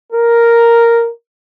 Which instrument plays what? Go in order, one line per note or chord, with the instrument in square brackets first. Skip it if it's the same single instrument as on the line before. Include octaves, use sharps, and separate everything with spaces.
[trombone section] A#4